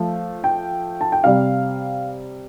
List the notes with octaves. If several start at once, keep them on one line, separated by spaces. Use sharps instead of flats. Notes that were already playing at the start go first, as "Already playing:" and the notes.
Already playing: F3 A3
G5
A5
G5
C3 G3 F5